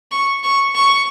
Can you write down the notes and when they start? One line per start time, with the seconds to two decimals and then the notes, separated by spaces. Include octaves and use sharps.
0.11 C#6
0.43 C#6
0.75 C#6